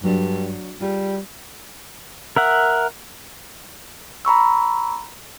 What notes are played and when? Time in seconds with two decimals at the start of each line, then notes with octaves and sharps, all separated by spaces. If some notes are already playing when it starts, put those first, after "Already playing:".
0.04 G2 F#3 A3 D4
0.81 G3 F4 G#4
2.36 A#4 E5 F#5
4.25 A#5 B5 C#6 E6